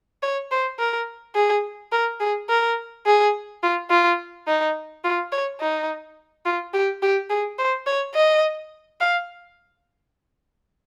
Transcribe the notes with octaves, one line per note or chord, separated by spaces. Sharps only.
C#5
C5
A#4
G#4
A#4
G#4
A#4
G#4
F4
F4
D#4
F4
C#5
D#4
F4
G4
G4
G#4
C5
C#5
D#5
F5